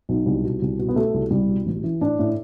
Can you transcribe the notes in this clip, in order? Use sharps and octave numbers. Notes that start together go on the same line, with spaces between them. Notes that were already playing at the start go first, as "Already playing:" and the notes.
B1
C2
B2
C2
B2
B3
B2 A3
C2
C2 G3
B2
A1
E3
A2 D4
A2